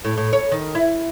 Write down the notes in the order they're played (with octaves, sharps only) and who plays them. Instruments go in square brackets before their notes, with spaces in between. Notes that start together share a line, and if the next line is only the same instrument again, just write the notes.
[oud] A2
A2
C#5
D#3
E4